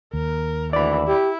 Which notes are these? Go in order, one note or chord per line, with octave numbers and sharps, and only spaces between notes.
D#2 A#4
D2 E3 D5 B5
E4 G4